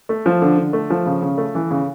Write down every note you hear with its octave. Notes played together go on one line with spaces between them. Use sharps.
A3
F3
D3
D3
A3
F3
C#3
C#3
A3
E3
C#3